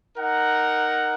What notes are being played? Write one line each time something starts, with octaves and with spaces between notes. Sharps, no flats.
D#4 A#4 F#5